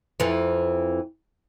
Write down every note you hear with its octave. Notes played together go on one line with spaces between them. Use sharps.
F2 E3